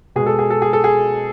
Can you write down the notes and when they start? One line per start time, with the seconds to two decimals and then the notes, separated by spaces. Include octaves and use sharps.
0.16 B2 G#3 G#4
0.26 A4
0.39 G#4
0.50 A4
0.62 G#4
0.73 A4
0.84 G#4